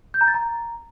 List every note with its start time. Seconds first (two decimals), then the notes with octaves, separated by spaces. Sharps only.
0.14 G6
0.21 A#5
0.28 A6
0.34 A#5